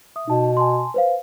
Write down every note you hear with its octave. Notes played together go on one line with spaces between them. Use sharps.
E5 D#6
B2 D#4 A5
G#5 A5 C6
B4 C5 F5